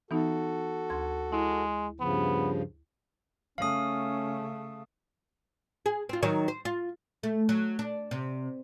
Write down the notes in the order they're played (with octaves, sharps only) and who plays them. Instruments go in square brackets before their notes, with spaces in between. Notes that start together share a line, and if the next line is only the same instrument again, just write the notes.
[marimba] E3 B3 D#4 [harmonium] F#4 A4
[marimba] D2 C6 G#6
[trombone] G#3 [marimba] E4
[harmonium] G2 C#3 F3 [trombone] B3
[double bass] C#3 A3 [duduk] C#4 [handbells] F5 D#6
[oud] G#4
C4 F4
D#3 F#3
C5
F4
A3
F#3
D4
C3